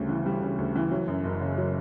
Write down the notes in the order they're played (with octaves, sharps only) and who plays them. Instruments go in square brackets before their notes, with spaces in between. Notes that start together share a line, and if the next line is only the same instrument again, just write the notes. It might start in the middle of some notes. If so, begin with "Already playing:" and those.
Already playing: [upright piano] D2 C#3 G3
E3
G3
C#3
D2
E3
F#3
F#2
F#1
C#3
F#3